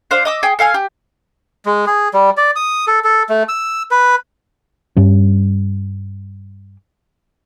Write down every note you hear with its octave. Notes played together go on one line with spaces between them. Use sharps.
D4 C5 F5
D#5 D6 E6
G#4 G5
A4 F5 G#5 F6
G4
G#3
G#4
G3
D5
D#6
A4
A4
A3
E6
B4
G2 G3 C#4